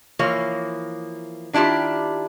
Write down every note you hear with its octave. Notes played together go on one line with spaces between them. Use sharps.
E3 F3 A#3 C#5
D#3 D4 E4 F4 G4